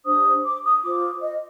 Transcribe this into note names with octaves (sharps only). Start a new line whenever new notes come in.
D4 G4 C5 D#6
D6
D#6
F4 C5 D6
D#5